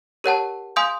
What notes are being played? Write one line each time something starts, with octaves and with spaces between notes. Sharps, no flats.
G4 A#4 C#5 F#5 A5
F5 G#5 C6 D#6 G6